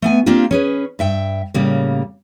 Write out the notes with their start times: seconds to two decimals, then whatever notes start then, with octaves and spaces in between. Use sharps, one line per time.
0.02 A3 B3 G#5
0.26 A#3 C4 D4 F4 G4
0.51 C#4 G#4 B4
0.99 G2 E5 G5
1.54 A2 C#3 G3 A#3